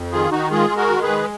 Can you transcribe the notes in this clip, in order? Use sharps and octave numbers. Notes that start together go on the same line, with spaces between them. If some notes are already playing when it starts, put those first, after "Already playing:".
Already playing: F2
D#3 F4 G#4
D#3 D#4 F#4
G#3 F4 G#4
G#3
F#4 A#4
D#3
G#4 B4
G#3